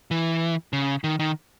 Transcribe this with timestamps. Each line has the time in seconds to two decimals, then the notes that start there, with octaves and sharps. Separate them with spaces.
0.11 E3
0.73 C#3
1.04 D#3
1.19 D#3